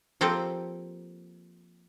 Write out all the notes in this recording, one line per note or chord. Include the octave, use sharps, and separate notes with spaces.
F3 A#3 C4 G4 A4